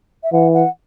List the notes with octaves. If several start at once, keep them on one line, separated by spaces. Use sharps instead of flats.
E5
E3 F#5
F#5